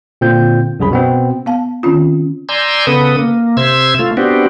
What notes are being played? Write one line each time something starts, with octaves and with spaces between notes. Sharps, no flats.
A#2 D3 C4 F4 G6
C2 F#2 G#4 B5
B2 B3 C4
B3 F5 A5
D#3 C4 C#4 F4
D5 G#5 A#5 C6 E6 G6
C#3 B3 A4 B4 D#6
A#3
C3 C5 E5 E6 G#6
A3 F4
B3 C4 D4 F#4 G4